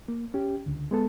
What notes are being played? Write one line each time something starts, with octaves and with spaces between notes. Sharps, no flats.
A#3
C#4 G4
C#2 D3
G#3 B3 A4